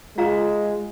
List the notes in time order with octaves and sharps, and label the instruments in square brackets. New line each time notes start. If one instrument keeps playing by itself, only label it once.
[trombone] G#3 [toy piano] F4 F5 A#5